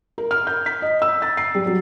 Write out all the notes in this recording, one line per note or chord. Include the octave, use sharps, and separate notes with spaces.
A#4
F6
G6
B6
D#5
E6
A6
C7
G3
F#3